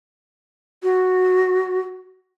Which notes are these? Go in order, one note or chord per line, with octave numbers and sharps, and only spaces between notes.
F#4